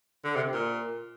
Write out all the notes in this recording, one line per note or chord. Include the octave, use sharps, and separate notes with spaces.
D3
C3
A#2